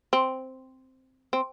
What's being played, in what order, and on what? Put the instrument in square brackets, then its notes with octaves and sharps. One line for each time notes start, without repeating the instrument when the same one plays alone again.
[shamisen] C4
C4